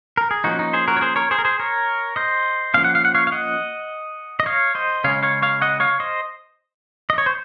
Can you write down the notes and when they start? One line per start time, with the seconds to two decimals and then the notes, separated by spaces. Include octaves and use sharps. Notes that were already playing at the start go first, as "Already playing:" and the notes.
0.17 A#4
0.31 G#4
0.44 F3 A#3 C#4 D#4 F#4
0.59 D#4
0.73 G#4 C5
0.88 F#4 A#4
0.97 C#5
1.01 G#4 C5
1.16 A#4 C#5
1.31 G#4 C5
1.39 A#4
1.45 G#4 C5
1.59 A#4 C#5
2.16 C5 D#5
2.74 F3 A#3 C#4 F5
2.84 F#5
2.95 F5
3.05 F#5
3.15 C#5 F5
3.27 F5
3.32 D#5 F#5
4.40 D#5
4.46 C#5 F5
4.75 C5 D#5
5.04 C#3 G#3 C#4 C#5 F5
5.23 C#5 F5
5.42 C#5 F5
5.62 D#5 F#5
5.80 C#5 F5
6.00 C5 D#5
7.10 D#5
7.18 C#5
7.26 C5